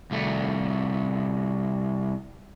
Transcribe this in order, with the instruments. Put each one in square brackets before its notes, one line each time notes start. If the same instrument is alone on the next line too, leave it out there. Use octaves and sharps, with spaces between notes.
[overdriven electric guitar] C2 A3